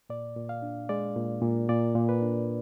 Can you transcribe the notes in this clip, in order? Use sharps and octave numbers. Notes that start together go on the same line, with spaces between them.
A#2 D5
A#2
F5
D4
G#3 D5
A#2
A#2
A#2 D5
A#2
B4
D4